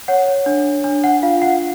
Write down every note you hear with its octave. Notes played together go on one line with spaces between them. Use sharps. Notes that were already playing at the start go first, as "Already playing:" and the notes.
C#5 F#5
D4
D4
F#5
F4 F5
F#5